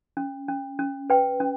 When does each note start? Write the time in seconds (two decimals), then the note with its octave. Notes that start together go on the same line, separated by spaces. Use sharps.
0.17 C#4
0.48 C#4
0.79 C#4
1.10 B4 G5
1.40 C#4